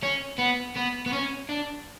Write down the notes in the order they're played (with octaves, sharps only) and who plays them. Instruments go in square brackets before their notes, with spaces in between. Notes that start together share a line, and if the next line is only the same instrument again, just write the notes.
[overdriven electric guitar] C#4
B3
B3
B3
C#4
D4